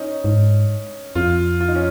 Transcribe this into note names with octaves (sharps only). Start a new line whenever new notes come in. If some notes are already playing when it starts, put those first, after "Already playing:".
Already playing: C#4 D#4
G#2
F2 F4
F4
D#4
C#4